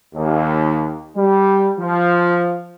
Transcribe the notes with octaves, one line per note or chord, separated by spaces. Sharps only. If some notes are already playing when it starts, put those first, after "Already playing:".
D#2
G3
F3